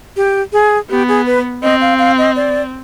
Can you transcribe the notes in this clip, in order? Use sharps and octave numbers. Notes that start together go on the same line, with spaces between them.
G4
G#4
B3 G4
G#4
B4
C4 D#5
F5
F5
D#5
D5